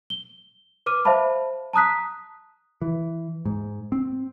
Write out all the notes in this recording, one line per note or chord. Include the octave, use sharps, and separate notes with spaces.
G7
B4 D6 F6 D#7
C5 E5 F5 A5 B5
A5 A#5 D#6 F#6 B6
E3
G#2
C4